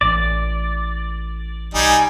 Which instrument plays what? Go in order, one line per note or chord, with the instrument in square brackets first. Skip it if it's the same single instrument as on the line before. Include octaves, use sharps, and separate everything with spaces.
[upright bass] A1 [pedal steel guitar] D5
[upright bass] B1 [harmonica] G3 D#4 [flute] G#5